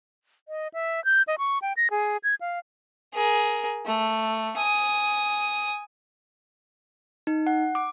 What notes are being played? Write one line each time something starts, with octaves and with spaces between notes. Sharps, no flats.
D#5
E5
G6
D#5
C#6
G5
A#6
G#4
G#6
F5
G#4 A#4
A3
G#5 D#6
D#4
F#5
D6